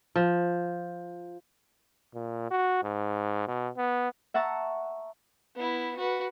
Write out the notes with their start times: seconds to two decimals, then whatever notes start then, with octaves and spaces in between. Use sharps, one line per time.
0.16 F3
2.14 A#2
2.51 F#4
2.83 G#2
3.48 B2
3.77 B3
4.34 E5 F#5 A5 A#5 C#6
5.55 B3 E4
5.96 F#4 B4